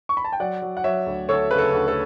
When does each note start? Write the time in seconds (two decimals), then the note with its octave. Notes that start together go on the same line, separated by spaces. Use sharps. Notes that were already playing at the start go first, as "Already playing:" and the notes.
0.09 C#6
0.17 B5
0.25 A5
0.32 G5
0.40 F#3 D5 F#5
0.62 F#3
0.77 F#5
0.84 F#3 C#5 E5
1.06 D2
1.29 D2 A4 C#5
1.51 C#3 B4
1.58 A4
1.73 D2
1.88 A4